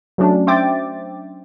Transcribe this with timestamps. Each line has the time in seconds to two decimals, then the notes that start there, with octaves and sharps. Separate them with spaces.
0.18 F#3 A3 C#4 D4
0.47 C5 E5 G5 D6 A6